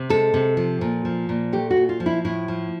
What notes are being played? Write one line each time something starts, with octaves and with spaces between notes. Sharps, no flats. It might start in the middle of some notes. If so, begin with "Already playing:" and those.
Already playing: C3
G#3 A4
C3
F3
A#2
F3
A#2
A3 G4
F#4
A#2
F4
F3
E4
A2 E4
F3